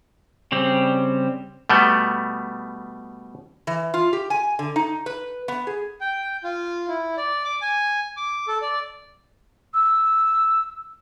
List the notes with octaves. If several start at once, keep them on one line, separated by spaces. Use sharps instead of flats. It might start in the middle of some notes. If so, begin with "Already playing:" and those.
C#3 G3 C4
B2 G3 A3 B3
E3
F4
G4
G#5
D3
D#4
B4
B3
G#4
G5
F4
E4
D5
D6
G#5
D6
A4
D5
E6